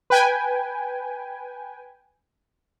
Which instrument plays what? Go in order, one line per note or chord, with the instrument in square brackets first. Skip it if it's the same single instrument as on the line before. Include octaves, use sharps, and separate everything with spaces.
[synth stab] B4 G5 G#5